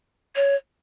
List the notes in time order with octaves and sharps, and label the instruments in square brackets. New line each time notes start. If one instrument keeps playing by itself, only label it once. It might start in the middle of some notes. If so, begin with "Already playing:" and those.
[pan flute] C#5